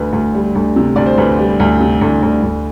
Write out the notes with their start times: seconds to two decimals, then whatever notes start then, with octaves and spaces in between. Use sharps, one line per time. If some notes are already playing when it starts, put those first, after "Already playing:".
Already playing: D2 B4
0.13 D2
0.34 G3
0.55 D2
0.76 C3
0.96 D2 D5
1.06 C5
1.18 D2 B4
1.39 G3
1.60 D2
1.80 C3
2.01 D2
2.22 D2
2.43 D2